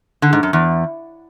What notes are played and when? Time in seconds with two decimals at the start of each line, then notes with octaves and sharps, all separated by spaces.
0.22 D3
0.33 G#2
0.43 F#2
0.53 E2